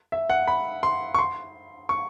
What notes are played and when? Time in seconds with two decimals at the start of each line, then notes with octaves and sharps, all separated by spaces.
0.12 E5
0.30 F#5
0.48 B5
0.83 C6
1.14 C#6
1.19 C6
1.89 C#6